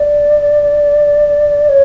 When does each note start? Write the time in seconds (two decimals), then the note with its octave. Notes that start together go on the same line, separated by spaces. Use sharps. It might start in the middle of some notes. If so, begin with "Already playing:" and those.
Already playing: D5
1.69 C#5